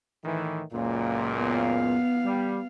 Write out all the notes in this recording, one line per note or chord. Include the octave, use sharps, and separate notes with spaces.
A2 D#3 E3
C#2 F#2 A#2 A#3
B3 F5
G3